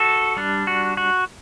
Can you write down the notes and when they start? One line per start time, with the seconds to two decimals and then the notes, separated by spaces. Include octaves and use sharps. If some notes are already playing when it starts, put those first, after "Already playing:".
Already playing: F#4 A4
0.37 G3 D4
0.67 F#4
0.97 F#4